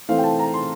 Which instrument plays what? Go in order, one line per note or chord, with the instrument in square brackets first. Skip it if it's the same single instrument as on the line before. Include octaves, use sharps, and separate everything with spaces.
[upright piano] E3 A3 C4 F5
G5
A5
A#5
C6